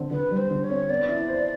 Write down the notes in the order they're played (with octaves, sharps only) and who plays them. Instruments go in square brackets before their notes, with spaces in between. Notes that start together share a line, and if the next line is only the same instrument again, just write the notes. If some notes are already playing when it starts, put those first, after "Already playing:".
Already playing: [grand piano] D3 C4
[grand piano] D3 [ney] B4
[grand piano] G3
[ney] C5
[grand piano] D3
[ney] C#5
[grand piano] C4
[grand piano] B3 [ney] D5
[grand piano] E4
C5